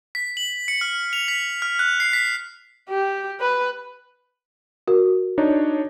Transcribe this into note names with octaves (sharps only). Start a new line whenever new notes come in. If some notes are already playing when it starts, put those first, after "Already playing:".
B6
F#7
C#7
F6
F7
B6
F6
F#6
C7
B6
G4
B4
F#4 A#4
D4 D#4 C#5